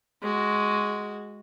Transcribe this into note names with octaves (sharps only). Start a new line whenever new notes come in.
G#3 F#4